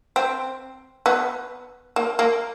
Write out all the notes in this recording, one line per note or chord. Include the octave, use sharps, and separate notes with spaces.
C4
B3
A#3
A#3